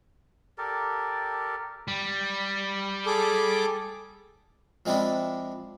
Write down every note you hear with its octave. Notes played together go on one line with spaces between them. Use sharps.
G4 A4 A#4 D5
G3
G#4 A4 D6
F3 G#3 C4 D4 E4